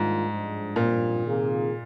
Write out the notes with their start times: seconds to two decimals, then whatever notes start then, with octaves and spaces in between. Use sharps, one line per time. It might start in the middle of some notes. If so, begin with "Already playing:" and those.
Already playing: G#2 D#3 G3 A#3 D4 F4
0.28 G2 F3 G#3 D4
0.76 G2 A#2 F3 C4 F4
1.25 C3 D#3 A#3 F4 G#4